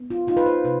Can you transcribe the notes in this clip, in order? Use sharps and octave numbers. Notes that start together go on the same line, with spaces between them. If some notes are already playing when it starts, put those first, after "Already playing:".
Already playing: B3
F4
D#4 F4
B4
C5
C3 B4